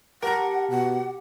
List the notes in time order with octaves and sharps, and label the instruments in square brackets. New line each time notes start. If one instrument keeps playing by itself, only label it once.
[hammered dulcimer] G4 A5 [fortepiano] A#4 A#5 [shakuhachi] F#5
[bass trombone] B2 [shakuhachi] F#5